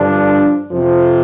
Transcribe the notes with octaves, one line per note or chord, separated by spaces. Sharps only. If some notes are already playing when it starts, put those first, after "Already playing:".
Already playing: G2 D3 F3 D4
F2 C3 F3